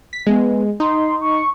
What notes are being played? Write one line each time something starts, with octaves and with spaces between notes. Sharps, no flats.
B6
G#3 B3
D#4 C6
C#6